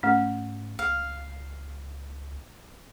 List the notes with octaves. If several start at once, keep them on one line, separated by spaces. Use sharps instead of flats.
G#2 A3 C#4
C#2 F5